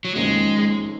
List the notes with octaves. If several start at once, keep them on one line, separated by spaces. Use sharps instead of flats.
F#3
F#1 F2 D#3 G#3 A#3 C#4